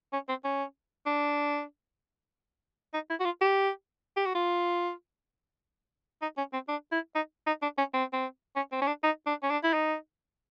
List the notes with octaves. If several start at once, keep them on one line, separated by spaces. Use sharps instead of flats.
C#4
C4
C#4
D4
D#4
E4
F#4
F4
G4
G4
F#4
F4
D#4
C#4
C4
D4
E4
D#4
D#4
D4
C#4
C4
C4
C#4
C4
C#4
D4
D#4
D4
C#4
D4
E4
D#4